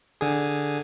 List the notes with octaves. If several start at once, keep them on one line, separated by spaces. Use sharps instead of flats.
D3 G#4